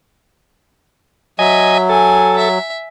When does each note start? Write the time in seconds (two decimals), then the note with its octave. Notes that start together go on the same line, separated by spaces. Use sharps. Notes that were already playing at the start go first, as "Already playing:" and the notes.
1.39 F#3 D#5 E5 G#5
1.89 A4 G#5
2.38 E5